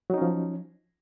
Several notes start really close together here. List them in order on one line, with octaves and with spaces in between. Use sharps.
F#3 D#4 C#4 F3